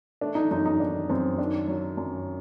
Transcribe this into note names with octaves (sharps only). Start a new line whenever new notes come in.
A3 D4
D#4
F#2 D#4
D#4
D#3 D4
F#2 C4
D#3 D4
F#3
F#2